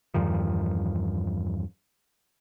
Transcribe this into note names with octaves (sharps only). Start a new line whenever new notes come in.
E2 G2 D#3 F3